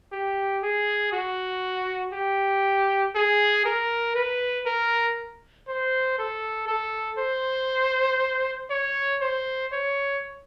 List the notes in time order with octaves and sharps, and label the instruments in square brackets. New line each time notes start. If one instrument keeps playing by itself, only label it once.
[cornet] G4
G#4
F#4
G4
G#4
A#4
B4
A#4
C5
A4
A4
C5
C#5
C5
C#5